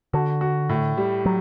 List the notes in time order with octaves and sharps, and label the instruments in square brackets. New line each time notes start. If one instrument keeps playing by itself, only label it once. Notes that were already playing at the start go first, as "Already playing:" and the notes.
[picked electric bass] D3 [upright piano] F#4
[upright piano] F#4
A2
G3
[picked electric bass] F#3